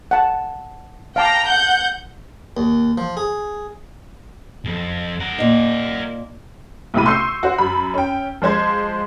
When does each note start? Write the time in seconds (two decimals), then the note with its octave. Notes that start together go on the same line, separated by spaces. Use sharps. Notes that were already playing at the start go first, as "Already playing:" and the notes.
0.11 F#5 A5
1.16 F5 G5 A5 A#5 D6
1.46 F#5 G6
2.57 D#2
2.98 F3
3.17 G#4
4.65 B1 F2
5.20 A#4 F#5
5.38 A#2 D#4
6.94 B1 A2 C3 E4 B5 D#7
7.06 C6 C#6 E6 G6 C7
7.43 F#4 C5
7.58 F#2 B5
7.94 C#4 G5
8.42 F3 G#3 C5 G#6